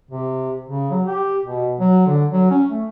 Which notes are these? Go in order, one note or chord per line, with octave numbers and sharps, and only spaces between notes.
C3
C#3
F#3
G4
B2
F#3
D3
F#3
C#4
A3